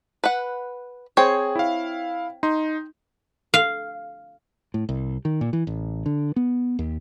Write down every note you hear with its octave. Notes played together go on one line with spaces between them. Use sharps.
B4 F#5
C4 G#4 C#5 G5
E4 F5
D#4 C6
F5
A2
C2
D#3
A#2
E3
A1
D3
B3
D#2